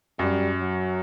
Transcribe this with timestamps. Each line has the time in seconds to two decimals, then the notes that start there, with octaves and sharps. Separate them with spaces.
0.19 F#2 G3
0.61 F#3